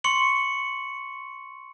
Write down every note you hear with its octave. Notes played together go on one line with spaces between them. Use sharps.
C6 C#6 C#7 F#7